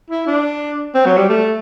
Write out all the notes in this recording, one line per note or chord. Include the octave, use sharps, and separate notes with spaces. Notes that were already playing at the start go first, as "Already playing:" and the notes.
E4
D4
C4
F#3
G3
A3